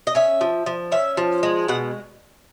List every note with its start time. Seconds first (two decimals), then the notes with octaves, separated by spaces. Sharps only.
0.07 D#5
0.15 C#4 E5
0.41 F3
0.66 F3
0.92 C#4 E5
1.17 F3
1.43 G#3
1.68 B2 F#5